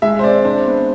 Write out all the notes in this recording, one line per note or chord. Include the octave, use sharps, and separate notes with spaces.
G#3 E5
C5
C4 D5
D4 C5
B3